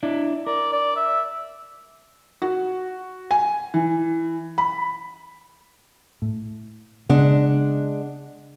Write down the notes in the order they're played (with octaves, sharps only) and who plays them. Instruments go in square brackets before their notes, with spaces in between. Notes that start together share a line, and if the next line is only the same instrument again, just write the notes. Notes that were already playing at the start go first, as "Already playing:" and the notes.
[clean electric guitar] D4 E4 D5
[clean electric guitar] A#4 [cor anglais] D5
[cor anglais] D5
E5
[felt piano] F#4
G#5
E3
B5
[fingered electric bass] A2
[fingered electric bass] C#3 B3 [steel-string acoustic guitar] G#3 D4 F#5